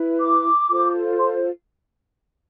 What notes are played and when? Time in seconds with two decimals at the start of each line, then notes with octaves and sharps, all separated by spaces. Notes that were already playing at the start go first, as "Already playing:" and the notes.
Already playing: E4 B4
0.19 D6
0.69 F4 A4 C5
1.19 C6